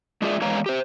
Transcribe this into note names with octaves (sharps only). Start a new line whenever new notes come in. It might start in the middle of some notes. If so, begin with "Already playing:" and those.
G#3 D4 F4 G#4 D5 E5
E2 E3 G#3 C#5 F5 A#5
G4 C5